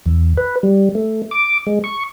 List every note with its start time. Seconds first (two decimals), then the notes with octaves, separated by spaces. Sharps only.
0.06 E2
0.37 B4
0.63 G3
0.95 A3
1.31 D6
1.67 G#3
1.84 C#6